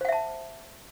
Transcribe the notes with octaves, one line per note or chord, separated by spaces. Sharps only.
C5 E5 F#5 A5